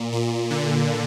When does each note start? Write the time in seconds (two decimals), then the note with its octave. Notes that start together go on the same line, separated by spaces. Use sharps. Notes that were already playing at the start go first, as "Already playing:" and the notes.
Already playing: A#2
0.12 A#2
0.50 D3